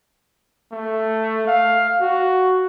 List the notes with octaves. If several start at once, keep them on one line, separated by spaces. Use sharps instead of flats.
A3
F5
F#4